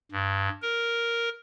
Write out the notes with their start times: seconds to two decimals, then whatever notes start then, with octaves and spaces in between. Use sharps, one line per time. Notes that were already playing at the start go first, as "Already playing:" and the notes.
0.12 G2
0.62 A#4